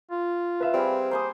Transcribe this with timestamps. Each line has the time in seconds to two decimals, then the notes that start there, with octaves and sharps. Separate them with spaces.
0.11 F4
0.60 B4 E5 F5
0.74 G3 C4 G#4
1.11 A#3 C5 G#5 D#6